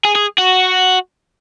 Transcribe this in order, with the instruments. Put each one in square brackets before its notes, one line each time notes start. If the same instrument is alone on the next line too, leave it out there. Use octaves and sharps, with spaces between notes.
[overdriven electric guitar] G#4
G#4
F#4